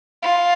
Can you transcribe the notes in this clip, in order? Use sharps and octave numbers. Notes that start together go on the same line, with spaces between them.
F4